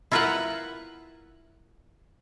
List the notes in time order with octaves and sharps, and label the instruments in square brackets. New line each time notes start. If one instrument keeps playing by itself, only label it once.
[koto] E4 F4 A#4 B4 E5 F#5